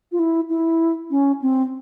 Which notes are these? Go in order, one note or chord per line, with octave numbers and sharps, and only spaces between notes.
F4
E4
E4
C#4
C4